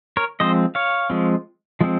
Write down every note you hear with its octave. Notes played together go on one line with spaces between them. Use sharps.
A#4 C#5
F3 G#3 C4 C5 D#5
C#5 F5
F3 G#3 C4
F3 G#3 C4